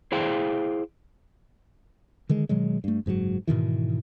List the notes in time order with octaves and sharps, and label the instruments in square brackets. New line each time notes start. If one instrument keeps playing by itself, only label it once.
[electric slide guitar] E4 G#4 C5 F5 G5
[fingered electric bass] D3 D#3 G#3
B2 D#3 F#3 G#3
G2 A3
F#1 G#2 C#3 F#3
G#2 B2 D#3 E3